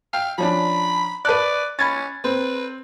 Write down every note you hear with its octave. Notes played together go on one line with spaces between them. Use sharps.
F5 G5
F3 C#4 D4 B5
B4 D5 A5 F#6
C#4 B5 G#6 A6
C4 B4